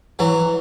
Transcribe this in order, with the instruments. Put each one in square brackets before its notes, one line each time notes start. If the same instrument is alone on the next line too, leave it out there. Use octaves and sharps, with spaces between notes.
[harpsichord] E3 F#3